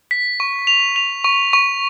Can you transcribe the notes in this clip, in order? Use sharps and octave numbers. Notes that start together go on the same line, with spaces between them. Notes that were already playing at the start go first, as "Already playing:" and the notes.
B6
C#6
F7
F7
C#6
C#6